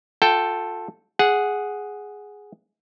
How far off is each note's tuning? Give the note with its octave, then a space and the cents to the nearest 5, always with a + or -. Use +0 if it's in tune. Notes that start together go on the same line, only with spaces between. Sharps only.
F4 +25 A4 +0 G5 -5
G#4 +0 F#5 +0